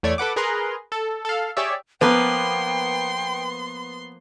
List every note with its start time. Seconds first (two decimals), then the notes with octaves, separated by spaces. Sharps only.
0.03 E2 A3 C#5 D5 G#6
0.18 A4 B4 F#5 D6
0.36 G#4 A#4 B4 A#5 C6
0.92 A4
1.25 A4 F5
1.57 G4 G#4 C#5 D5 E5
2.01 F3 A#3 B3 B4 G5 C6